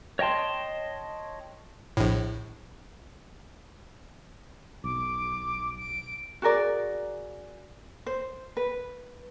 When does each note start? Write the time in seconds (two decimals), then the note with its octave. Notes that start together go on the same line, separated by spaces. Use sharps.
0.19 C#5 D#5 G5 A5 C6
1.97 A#1 A2
4.84 B1 D6
5.78 D7
6.42 F#4 G#4 A#4 D5
8.06 C5
8.57 B4